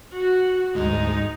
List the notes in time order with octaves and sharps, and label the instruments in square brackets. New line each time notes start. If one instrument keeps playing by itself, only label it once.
[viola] F#4
[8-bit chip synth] D2 G#2 G#3 [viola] D#4